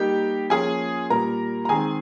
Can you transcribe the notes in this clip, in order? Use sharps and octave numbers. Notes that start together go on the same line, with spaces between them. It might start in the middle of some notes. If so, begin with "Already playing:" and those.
Already playing: G3 A#3 D#4 G4 G5
F3 A#3 C#4 F4 G#4 G#5
A#2 G3 A#3 A#4 A#5
A#5
D#3 G#3 C4 G#4 G#5